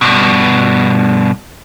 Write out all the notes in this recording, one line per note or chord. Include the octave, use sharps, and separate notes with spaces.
G2 B2